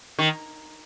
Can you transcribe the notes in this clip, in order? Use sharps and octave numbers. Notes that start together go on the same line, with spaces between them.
D#3